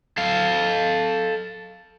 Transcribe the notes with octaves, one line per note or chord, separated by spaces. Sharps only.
A4 F5